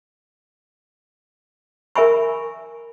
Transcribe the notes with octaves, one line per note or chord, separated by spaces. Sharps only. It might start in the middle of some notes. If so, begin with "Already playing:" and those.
A#4 E5 G#5 B5 C#6